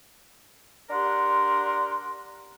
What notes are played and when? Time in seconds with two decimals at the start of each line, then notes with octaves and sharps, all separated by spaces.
0.91 D4 G4 A#4 F#5 C6